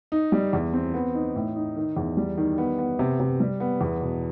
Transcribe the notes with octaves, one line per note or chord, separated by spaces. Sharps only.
D#4
G3
E2
C4
B3
D#4
A2
D#4
D#3
E2
G3
D#3
B3
B3
C3
C3
G3
B3
E2
B2